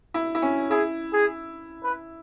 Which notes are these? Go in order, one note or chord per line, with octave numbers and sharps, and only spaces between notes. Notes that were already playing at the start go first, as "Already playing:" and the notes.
E4
E4
C#4
E4 G#4
G#4
B4